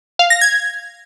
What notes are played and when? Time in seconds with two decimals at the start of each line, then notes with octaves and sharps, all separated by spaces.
0.19 F5
0.30 A#6
0.41 G#6